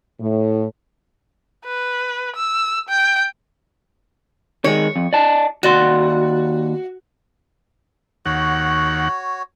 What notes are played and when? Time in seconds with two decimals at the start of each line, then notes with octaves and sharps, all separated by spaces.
0.20 A2
1.65 B4
2.36 E6
2.89 G5
4.64 D#3 G#3 C#5
4.96 F2
5.13 D5 D#5 A5
5.63 D#2 F#4 D5 C6
8.26 D#2 F#4 C#5 F#5